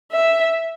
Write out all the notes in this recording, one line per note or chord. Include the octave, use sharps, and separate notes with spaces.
E5